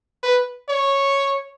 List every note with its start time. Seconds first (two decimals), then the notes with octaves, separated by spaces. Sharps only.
0.23 B4
0.69 C#5